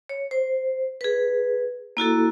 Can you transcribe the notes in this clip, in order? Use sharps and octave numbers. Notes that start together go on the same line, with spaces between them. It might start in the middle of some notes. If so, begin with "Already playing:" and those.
C#5
C5
G#4 B4
A#3 E4 F#4 A4